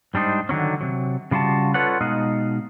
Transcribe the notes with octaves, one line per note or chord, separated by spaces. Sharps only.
G#2 G3 D4 D#4 C5
D3 D#3 F#3 C#4
C3 F#3
C#3 G3 F4 F#4 A5
F4 A4 B4 C#5 D5 F#5
B2 G#3 D#4 D#5 F5